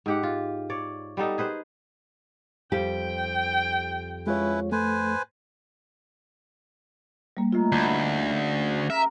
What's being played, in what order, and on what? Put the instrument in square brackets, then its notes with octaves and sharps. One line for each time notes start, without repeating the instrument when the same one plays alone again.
[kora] G#2 G4 F#5
F4
C#5 D5
G3 B3 D#4 A4
G#4 B4 C5
[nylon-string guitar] F2 G3 G4 [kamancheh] G5
[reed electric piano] G#3 F4 C#5 [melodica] C#4 E4 B4
[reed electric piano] A3 [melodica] B4 C5 G#5
[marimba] G3 A#3
[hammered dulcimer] A2 D#3 [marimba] A3 F4
[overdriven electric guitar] D2 [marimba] A5 [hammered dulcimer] B5
[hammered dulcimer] C#3
[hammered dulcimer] A#4 A#5 [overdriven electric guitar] E5